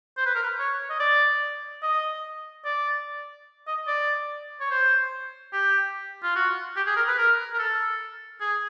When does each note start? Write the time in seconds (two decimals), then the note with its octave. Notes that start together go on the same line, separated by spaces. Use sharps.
0.17 C5
0.25 B4
0.35 A#4
0.43 B4
0.59 C#5
0.90 D#5
1.00 D5
1.82 D#5
2.65 D5
3.67 D#5
3.87 D5
4.60 C#5
4.71 C5
5.53 G4
6.23 F4
6.36 F#4
6.76 G4
6.86 G#4
6.96 A#4
7.08 B4
7.18 A#4
7.54 A#4
7.58 A4
8.40 G#4